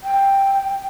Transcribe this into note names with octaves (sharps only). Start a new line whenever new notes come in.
G5